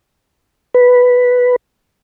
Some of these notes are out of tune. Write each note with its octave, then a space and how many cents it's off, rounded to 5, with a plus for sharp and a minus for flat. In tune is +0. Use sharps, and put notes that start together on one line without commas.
B4 +0